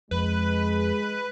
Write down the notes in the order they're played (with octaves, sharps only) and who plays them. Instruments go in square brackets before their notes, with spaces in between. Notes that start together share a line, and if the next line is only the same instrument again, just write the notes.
[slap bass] F2 [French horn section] G#3 [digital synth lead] B4